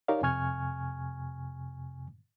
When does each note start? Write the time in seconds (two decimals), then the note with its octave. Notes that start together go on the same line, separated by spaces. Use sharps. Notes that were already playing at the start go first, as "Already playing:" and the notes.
0.08 D#4 G4 A#4 C#5 D5 F5
0.22 F2 C3 G#5 C#6 F6 G#6